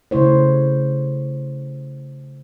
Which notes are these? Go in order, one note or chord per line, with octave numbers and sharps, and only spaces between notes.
C#3 A3 E4 C5 C#5